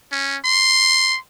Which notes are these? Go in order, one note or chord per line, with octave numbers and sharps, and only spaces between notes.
C#4
C6